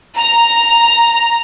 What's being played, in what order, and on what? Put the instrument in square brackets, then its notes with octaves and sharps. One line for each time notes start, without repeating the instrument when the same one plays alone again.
[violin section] A#5